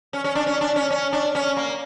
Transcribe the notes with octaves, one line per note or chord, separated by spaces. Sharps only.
C#4
C#4
D4
C#4
D4
C#4
C#4
D4
C#4
A#3